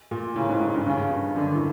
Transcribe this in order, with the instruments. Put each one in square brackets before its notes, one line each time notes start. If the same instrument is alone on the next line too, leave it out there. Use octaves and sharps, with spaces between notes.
[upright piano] A#2
[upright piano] A2 [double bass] C#3
[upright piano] G#2
G#2
G2
[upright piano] G2 [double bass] C#3
[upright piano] G2
[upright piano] F#2 [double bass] D3
[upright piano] A2